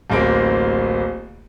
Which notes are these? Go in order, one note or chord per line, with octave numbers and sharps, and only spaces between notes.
D1 A1 A#3 C4 D7